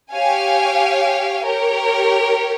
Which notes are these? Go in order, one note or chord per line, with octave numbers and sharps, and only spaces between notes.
G4 C#5 F5 G#5
G4 A#4 C#5